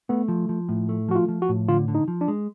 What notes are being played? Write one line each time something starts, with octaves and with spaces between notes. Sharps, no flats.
A3 B3
F3
F3
A2
A3
F3 F#4
F4
F3
F#4
A2
D3 F4
D3
D#4
F3
D4
G#3